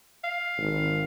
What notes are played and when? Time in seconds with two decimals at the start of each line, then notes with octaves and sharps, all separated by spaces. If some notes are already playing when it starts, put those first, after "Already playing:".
0.24 F5
0.58 G#1